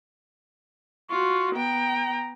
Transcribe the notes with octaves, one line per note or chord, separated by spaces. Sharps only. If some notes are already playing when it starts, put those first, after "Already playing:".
F4 F#4 C#6
B3 G5 A#5